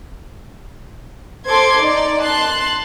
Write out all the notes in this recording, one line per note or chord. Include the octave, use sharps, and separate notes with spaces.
A4 C5 C6 D6 G#6
D#4 D5
A5 C6 F#6